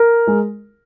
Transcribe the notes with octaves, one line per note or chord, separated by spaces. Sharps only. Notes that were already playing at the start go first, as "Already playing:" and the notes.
Already playing: A#4
G#3